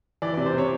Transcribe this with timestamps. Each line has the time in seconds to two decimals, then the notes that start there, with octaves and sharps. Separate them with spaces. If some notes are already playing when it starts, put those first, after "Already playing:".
0.22 E3 D5
0.34 C3 D5
0.46 C5
0.54 C3 C#5